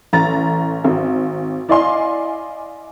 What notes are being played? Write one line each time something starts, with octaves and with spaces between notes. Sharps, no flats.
A1 A#5 A6
G#1
E4 D5 D#5 F5 G#5 C6